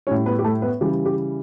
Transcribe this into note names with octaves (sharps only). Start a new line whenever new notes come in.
A2 G3 C#4 C#5
B3 B4
G4
A3 A4
B3 B4
C#3 E3 G3 G4
G4